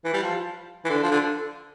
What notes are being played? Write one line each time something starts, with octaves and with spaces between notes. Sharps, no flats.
E3
G3
F3
E3
D3
F3
D3